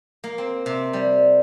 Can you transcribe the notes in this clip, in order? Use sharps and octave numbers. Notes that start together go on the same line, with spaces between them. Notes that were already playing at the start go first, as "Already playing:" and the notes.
A#3
C4
C3
G3